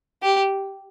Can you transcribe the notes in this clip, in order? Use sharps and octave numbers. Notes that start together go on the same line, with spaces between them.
G4